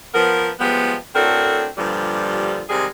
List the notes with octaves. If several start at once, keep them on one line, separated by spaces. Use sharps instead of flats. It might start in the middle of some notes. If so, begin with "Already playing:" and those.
F3 B3 A#4
F3 G3 G#3 B3
A2 C4 D4 F#4 A4 A#4
G2 A#2 D3 F3 G3
C3 D#3 G3 G#3 G#4